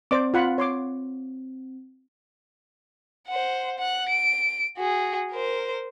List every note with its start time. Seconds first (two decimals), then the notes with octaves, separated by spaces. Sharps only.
0.11 C4 C5 D5 D6
0.34 F4 F#5 B5
0.58 C#5 C6 D6
3.28 C5 F#5
3.79 F#5 F#6
4.09 D7
4.77 F#4 G#4
5.32 A#4 C5